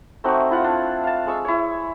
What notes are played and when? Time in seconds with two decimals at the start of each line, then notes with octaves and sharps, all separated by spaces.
0.24 A3 C4 D#4 F#4
0.51 E4 F4 F#5
0.64 D4
1.04 F5 A5
1.27 G#3 C#6 E6
1.45 E4 C#5